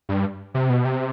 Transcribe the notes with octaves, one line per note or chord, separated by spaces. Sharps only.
G2
C3
B2
C3